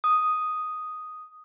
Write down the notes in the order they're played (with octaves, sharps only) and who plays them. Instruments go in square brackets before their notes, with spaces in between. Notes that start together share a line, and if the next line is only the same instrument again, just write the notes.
[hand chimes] D#6